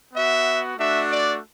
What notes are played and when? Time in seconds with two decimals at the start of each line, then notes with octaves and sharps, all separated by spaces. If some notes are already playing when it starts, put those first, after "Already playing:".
0.14 B3 F#4 E5
0.77 A3 D4 F#4 E5
1.09 D5